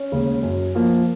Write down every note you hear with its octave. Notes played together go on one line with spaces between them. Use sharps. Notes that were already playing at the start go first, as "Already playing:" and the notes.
Already playing: C#4
D#2 C#3 G#3
F#2
F3 A#3